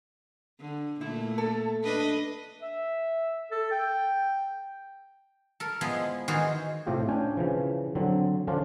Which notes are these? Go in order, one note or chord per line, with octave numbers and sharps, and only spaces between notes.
D3
A#2 A3 E4
A4
D4 B4 D#5
E5
A4
G5
A4 A#4
F3 G#3 B3 E4 G#4
D#3 E3 F#4 G#4 C5
A2 C3 A3 F4 G4
C#4 D4 G5 G#5
C#3 E3 F3
D3 F#3 C4
D3 F3 C#4 D4 F4